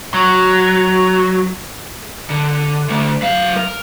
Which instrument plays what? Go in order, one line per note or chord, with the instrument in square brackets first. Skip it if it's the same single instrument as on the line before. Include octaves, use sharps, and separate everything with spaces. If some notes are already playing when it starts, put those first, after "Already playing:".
[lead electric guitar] F#3 [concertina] A#5
[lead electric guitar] D3
D3 A3
F#3 F5
A#4